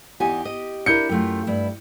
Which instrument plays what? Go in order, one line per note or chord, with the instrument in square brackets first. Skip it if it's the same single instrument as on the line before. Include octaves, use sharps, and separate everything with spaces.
[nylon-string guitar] E2 D#4 G#5 [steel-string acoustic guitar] G4
[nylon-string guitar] D#5
[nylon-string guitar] D4 E4 A#4 [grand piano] G6 C#7
[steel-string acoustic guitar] F#2 A3 F4 [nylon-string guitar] G4
[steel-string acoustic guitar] G2 E4